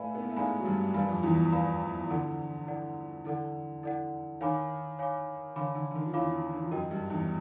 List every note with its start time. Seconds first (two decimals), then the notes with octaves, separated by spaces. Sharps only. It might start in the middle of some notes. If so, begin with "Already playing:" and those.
Already playing: A2 A3 B4 D5 F5 G#5 B5
0.15 B3
0.22 A#3
0.29 A3
0.36 G#2 G#3 B4 D5 F5 G#5 B5
0.59 F#3
0.65 G2 G3
0.94 G2 G3 B4 D5 F5 G#5 B5
1.09 F2 F3
1.23 E2 E3
1.52 B4 D5 F5 G#5 B5
2.09 D3 E4 A4 D5 F#5
2.67 E4 A4 D5 F#5
3.25 D3 E4 A4 D5 F#5
3.83 E4 A4 D5 F#5
4.41 D#3 C#5 F5 G#5 B5 D6
4.99 C#5 F5 G#5 B5 D6
5.56 D3 C#5 F5 G#5 B5 D6
5.75 D3
5.91 D3
5.95 D#3
6.06 F3
6.14 E2 E3 C#5 F5 G#5 B5 D6
6.53 E3
6.63 F3
6.71 F#2 F#3 A#4 D#5 G5
6.91 G2 G3
7.10 E2 E3